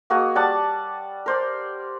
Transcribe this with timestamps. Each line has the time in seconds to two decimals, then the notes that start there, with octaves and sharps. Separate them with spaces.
0.10 A#3 F#4 G#4 D#5
0.35 G3 F#5 A5 D6
1.26 A#4 C5 D5